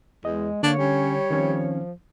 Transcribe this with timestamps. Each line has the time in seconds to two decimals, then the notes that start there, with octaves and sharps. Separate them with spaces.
0.25 E2 G#3 D#5
0.63 D3 A#3 D4 C#5
0.78 G3 C#4
1.31 D#3 F3 C4 C#4